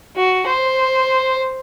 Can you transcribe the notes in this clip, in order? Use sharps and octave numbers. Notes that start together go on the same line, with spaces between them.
F#4
C5